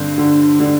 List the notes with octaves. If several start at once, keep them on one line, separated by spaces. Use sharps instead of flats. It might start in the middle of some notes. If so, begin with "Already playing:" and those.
Already playing: G2 D3 C4
D3
D3